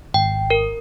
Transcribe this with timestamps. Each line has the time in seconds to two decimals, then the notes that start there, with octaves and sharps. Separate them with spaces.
0.14 G#1 G5
0.50 A#4